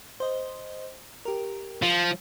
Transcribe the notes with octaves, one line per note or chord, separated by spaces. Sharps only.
C5 D#5
G4 A#4
F3